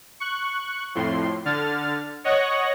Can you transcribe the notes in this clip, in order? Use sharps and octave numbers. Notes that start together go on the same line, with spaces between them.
C#6 F#6
F2 A2 C6
D3 F6 A6
C#5 D#5 F#5 C#6 F#6 A#6